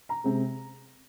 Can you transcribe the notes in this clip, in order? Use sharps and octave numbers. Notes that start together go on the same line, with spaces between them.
A#5
C3 G#3 C4